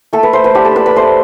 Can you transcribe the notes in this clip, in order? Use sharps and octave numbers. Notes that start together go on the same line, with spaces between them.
A3 A4
B4
A3 C5
B4
D4 G4
A4
D4 B4
B4
A3 C5